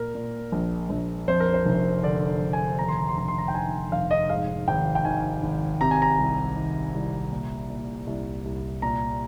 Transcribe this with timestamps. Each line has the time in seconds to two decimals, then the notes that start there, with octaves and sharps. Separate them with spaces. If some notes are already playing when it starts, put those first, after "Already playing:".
Already playing: A#2 A#4
0.15 A#2
0.52 A#1
0.90 A#1
1.28 F2 C5
1.40 A#4
1.54 C5
1.65 F1
2.03 D3 D5
2.41 F1
2.53 G#5
2.79 D#2 A#5
2.88 C6
2.98 A#5
3.08 C6
3.17 F1 A#5
3.28 C6
3.38 A#5
3.48 G5
3.54 D#3 G#5
3.92 F1 F5
4.11 D#5
4.29 G#2 F5
4.68 G#1 G5
4.95 G5
5.05 D#3 G#5
5.43 G#1
5.81 C3 A#5
5.91 G#5
6.02 A#5
6.19 C2
6.56 D#3
6.94 C2
7.32 A#2
7.70 A#2
8.07 C2
8.45 C2
8.82 A#2 A#5